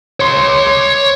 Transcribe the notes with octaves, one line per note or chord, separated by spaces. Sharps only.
C#5 C6